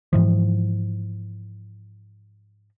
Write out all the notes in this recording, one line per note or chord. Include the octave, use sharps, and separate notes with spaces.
G#2 E3 F3